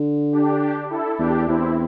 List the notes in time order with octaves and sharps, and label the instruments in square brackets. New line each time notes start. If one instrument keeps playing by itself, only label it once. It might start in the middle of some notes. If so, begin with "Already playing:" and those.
Already playing: [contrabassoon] D3
[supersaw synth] D4 G4
E4 A4
[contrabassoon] E2 [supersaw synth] D4 G4
[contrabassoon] E2 [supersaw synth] C4 E4